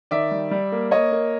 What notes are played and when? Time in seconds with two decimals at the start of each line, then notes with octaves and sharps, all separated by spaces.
0.11 D#3 D5 E5
0.31 G3
0.51 G3
0.72 A#3
0.91 A#3 C#5 D#5
1.12 A#3